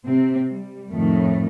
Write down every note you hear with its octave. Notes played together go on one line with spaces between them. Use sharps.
C3 C4
G3
F2 A2 D#3 A3